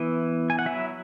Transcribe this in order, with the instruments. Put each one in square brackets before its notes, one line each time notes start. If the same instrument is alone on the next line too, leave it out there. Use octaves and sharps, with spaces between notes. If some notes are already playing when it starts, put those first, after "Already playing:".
Already playing: [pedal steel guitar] E3 B3 E4
G#5
F#5
F#3 E4 E5